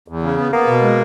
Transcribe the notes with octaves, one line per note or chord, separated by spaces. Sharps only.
E2
C#3
B3
A#3 B3
B2
G#3